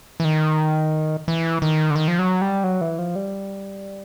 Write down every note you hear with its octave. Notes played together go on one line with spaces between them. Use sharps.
E3
D#3
E3
D#3
D3
D#3
F3
F#3
G3
F#3
E3
F3
G3